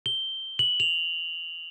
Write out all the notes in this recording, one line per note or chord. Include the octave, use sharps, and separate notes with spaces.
G7
F#7
F7